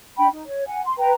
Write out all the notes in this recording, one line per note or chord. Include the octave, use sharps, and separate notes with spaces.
D4 G5 B5
D#4
C#5
F#5 G#5
C6
B4 G5 A#5